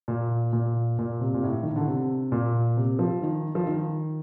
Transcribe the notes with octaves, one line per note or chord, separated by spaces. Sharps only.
A#2
A#2
A#2
C3
A#2
A2
D#3
D3
C3
A#2
C3
F3
D#3
F3
D#3